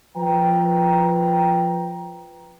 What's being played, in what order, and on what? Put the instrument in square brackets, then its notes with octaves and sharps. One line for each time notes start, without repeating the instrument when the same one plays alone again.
[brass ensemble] F3 B4 G5 A#5